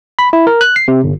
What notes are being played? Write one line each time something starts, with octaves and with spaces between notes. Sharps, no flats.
B5
E4
A#4
F#6
C7
C3
G1